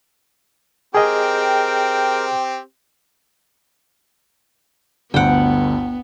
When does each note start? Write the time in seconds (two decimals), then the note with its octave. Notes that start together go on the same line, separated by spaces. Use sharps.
0.95 C4 G4 G#4 A#4 D#5 G5
5.14 G1 D2 B3 F#5 G5